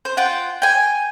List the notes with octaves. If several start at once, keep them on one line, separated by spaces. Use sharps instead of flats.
C5
F4 F#5 G5
G5 G#5